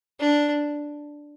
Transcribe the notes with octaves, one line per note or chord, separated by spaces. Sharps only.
D4